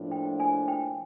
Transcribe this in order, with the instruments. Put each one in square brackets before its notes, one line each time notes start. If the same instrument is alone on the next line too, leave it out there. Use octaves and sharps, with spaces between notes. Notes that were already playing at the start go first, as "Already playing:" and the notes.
Already playing: [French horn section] A2 F3 A#3 D4
[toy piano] G5
G#5
G5